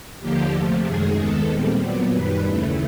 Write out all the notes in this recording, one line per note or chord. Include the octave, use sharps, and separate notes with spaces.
D#2 D3 F3 A#3 G4
C3 F3 A3
F#2 D#3 G#3 G#4
D#2 D#3 G#3 B3 A4
A#2 G3 C4
A#2 F#3 B3 D5
F#2 D#3 G3 B4
D#2 C#3 E3 A3